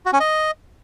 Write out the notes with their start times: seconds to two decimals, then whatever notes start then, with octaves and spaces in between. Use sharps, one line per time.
0.06 F#4
0.13 C#4
0.20 D#5